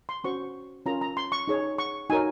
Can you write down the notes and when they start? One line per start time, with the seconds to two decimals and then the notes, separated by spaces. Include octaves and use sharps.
0.09 C6
0.24 C#4 F#4 C5 C#6
0.86 C#4 F4 A#4 A#5
1.01 A#5
1.17 C6
1.32 C#6
1.48 D#4 G#4 C#5
1.78 C#6
2.10 D#4 F#4 A#4 C#5 G#5